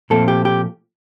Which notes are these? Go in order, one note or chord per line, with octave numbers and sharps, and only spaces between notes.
A#2 F3 A3 C4 A4
G4
G4